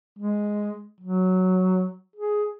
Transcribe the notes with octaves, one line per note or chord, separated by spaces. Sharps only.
G#3
F#3
G#4